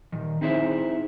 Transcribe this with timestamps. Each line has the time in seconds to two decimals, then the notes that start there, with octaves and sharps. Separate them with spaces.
0.12 A#2 D#3
0.41 C4 D#4 E4 G#4 C5 E5